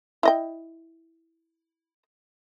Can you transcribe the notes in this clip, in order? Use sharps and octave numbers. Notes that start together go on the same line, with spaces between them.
E4 D#5 G5